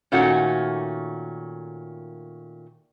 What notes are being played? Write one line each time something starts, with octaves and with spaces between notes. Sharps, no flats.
A#2 D#3 A3 C#4 F#4